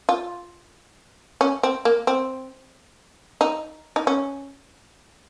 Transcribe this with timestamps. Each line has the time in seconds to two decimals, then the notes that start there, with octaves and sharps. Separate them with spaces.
0.09 F4
1.41 C#4
1.63 C4
1.85 A#3
2.07 C4
3.41 D#4
3.96 D#4
4.07 C#4